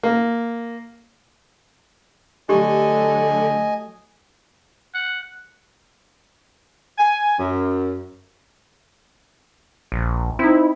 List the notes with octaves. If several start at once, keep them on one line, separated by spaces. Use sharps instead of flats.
A#3
D3 F#3 A3 G4 D#5 G#5
F#5
G#5
F#2
A#1
C4 D#4 E4